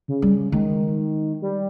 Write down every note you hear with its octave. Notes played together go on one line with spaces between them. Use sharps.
C#3
G3
D#3 G#3
G3